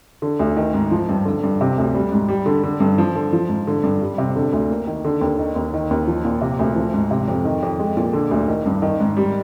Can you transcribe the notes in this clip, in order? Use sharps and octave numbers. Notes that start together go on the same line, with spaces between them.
D3
D2
D#3
G#2
F3
G2
D3
G2
C3
D2
G3
G#2
G3
D3
D3
G2
F3
D3
F3
G#2
D3
G2
G3
C3
D3
D2
A#3
D#3
D3
D#2
D#3
D#2
D#3
D#2
F3
A#2
C3
D2
F3
G#2
C3
F2
D#3
F2
G#3
A#2
D3
D2
D#3
G2
D#3
G#2
G3